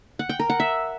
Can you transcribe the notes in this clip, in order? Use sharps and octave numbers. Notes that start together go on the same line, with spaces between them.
F#5
G5
A#4
F#5
E5